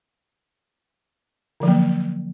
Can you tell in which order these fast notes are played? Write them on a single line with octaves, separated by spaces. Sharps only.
D3 F3 F#3 A#3